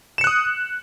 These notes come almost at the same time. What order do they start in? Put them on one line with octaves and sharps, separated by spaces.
E7 C#7 F#6 D#6